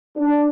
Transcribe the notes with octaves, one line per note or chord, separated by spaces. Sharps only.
D4